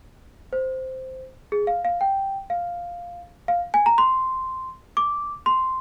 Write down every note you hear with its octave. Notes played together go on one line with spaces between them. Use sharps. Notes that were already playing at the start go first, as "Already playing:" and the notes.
C5
G#4
F5
F5
G5
F5
F5
G#5
A#5
C6
D6
C6